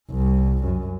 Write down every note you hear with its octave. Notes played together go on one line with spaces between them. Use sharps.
C2
F#2